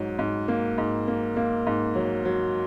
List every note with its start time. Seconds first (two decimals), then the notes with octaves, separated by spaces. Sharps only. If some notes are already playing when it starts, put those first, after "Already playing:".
Already playing: G#2 F#3
0.19 G#2
0.48 A#3
0.78 G#2
1.08 A#3
1.37 A#3
1.67 G#2
1.95 F#3
2.25 F#3